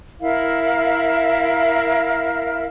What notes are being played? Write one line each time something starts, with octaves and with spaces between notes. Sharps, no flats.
E4 A#4 E5 F5